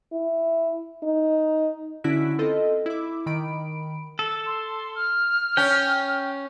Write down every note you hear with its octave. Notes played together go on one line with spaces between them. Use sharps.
E4
D#4
D3 C#4 E4 F#4 B6 D7
C4 F4 A4 D#5
E4 D6
D#3 B5 D7
A4
C6
F6
C#4 G5